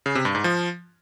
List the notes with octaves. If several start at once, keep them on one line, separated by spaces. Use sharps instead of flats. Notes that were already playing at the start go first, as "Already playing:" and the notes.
C#3
C3
G2
G#2
F3